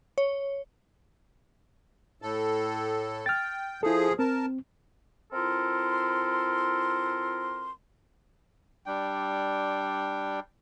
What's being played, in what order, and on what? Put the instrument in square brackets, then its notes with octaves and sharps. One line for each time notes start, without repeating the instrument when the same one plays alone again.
[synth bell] C#5
[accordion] A2 A4
[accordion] G5 [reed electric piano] F6 A6
[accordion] F3 G#4 [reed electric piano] E4 A4
[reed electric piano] C4 [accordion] A#4 A5
[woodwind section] C4 E4 F4 A4 A#4 C6
[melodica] G3 D4 G5